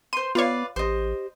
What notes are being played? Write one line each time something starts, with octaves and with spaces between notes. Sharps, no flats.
C5 C6 D#7
B3 F4 B4 C#5 D5 F5
A1 G4 C5 D#5